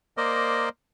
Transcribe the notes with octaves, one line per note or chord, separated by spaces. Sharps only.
A#3 A#4 C5 D5 D#5